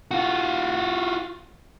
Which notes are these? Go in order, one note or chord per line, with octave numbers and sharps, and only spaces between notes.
F4 F#4